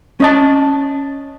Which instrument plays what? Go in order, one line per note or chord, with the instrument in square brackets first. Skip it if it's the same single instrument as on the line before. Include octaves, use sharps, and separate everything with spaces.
[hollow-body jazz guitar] C#4 D#5 A5